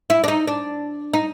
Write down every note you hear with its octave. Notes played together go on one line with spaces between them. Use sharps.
E4
D4
D#4
D4
D#4